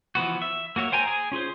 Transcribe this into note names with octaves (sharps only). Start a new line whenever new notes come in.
E3 F3 B3 F#4
E5
A#3 F#4 C#5 E5
C5 G5 G#5 A#5
G#4 G#5
C#4 F4 G#4 C5